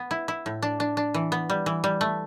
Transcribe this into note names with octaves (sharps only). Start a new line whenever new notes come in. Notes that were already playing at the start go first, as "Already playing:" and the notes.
Already playing: B3
E4
E4
A2
D4
D4
D4
E3
B3
G3
E3
G3
A3